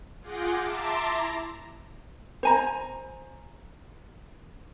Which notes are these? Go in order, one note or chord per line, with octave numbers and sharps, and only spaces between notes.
F4 G#4 F#5 D6 G6 A#6
E5 A5 A#5 C6 D6
E4 A#5
C5 G#5 A#5